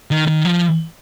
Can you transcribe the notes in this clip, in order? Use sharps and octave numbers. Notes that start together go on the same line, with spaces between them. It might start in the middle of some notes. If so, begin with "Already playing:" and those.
D#3
D#3
F3